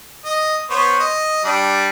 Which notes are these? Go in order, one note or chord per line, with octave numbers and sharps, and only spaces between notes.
D#5
B3 C5 C#5
D#5
G3 D4